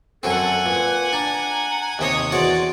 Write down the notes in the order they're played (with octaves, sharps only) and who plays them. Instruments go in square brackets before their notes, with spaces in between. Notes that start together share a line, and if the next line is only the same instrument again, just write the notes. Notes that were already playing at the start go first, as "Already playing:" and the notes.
[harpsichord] F#2 F#3 C4 [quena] A4 [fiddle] F#5 G#5
[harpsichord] A#2 [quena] B4
[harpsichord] D4 [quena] A#5
[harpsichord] D#2 C3 D#6 [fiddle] C#5 D#5
[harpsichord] E2 F#4 C#5 [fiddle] D5 [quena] C6